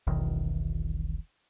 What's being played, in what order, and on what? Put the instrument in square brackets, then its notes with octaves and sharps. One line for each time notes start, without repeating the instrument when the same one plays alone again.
[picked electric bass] E1 B1 E2 D#3